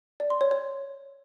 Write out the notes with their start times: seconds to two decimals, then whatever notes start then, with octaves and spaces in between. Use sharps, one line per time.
0.20 D5
0.30 C6
0.41 C#5
0.51 C#5